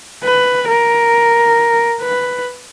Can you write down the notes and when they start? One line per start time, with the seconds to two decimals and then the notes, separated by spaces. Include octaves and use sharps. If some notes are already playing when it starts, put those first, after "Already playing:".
0.23 B4
0.68 A#4
2.01 B4